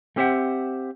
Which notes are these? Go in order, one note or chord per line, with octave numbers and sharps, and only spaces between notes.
A3 C4 G4 C5 E5 F#5